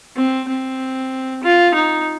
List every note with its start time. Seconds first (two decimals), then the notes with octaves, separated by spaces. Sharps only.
0.16 C4
0.48 C4
1.43 F4
1.74 D#4